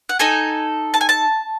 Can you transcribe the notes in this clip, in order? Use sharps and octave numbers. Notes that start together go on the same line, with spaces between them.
F#5
D#4 A4 G#5
A5
G#5
A5